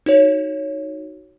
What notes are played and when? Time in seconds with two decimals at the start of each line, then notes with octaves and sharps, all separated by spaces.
0.06 D#4 F#4 C#5